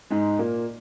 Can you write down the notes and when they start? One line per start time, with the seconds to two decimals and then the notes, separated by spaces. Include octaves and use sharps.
0.10 G#2 G#3 D#4
0.39 A#2 A#3